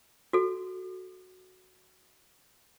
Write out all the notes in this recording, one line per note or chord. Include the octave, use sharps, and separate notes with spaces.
F#4 A4